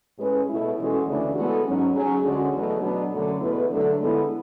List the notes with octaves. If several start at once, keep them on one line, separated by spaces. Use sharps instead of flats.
A2 G#3 C#4 G#4 B4
B2 A3 E4
E3 G#3 C#4 F#4 A4
D2 C#3 E3 A3 D4
E3 G#3 B3 F#4 A4
G#2 F#3 C#4
F#3 C#4 G#4
D2 D3 G#3 C#4 F#4
E2 B2 F#3 A3
B2 F#3 B3 D4
F#2 D3 F#3 A3
E2 B2 A3 E4 B4
D3 F#3 A3 D4 A4
D3 G#3 B3 E4 A4